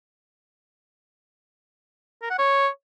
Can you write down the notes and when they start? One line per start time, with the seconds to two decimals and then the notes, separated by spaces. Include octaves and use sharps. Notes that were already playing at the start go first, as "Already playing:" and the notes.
2.22 A#4
2.30 F#5
2.38 C#5